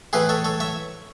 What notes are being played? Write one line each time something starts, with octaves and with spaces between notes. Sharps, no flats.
A2 E3 G#4 B4
A4 C#5
A4 C#5
C#5 E5